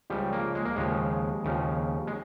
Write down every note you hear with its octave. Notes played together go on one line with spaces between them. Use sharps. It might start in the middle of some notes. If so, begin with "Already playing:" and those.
C#2 C#3 F3 G3
A#3
G#3
A#3
D#2 C#3 F3 G#3
D#2 C#3 F3
G#3